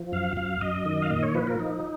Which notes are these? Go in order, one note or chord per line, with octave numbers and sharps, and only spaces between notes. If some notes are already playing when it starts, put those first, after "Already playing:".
Already playing: F3
F#2 F5
F#2 F5
F#2 D#5
D#3
F5
A#2 D#5
C#5
F3 B4
A#4
F3 D#4